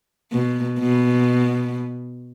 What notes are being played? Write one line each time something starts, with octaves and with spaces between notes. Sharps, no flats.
B2
B2